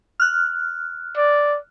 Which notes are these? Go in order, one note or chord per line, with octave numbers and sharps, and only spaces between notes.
F6 F#6
D5